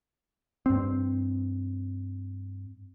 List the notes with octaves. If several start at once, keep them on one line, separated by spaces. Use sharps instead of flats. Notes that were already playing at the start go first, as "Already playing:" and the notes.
G2 C4